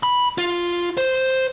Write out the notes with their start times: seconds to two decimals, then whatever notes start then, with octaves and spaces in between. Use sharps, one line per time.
0.03 B5
0.38 F4
0.97 C5